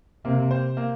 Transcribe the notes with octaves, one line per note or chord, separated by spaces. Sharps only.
C3 A#3
C5
A#3